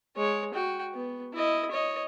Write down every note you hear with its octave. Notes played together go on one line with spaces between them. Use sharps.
G#3 C#5
F#4 G5
B3
E4 D#5
C#5 D#5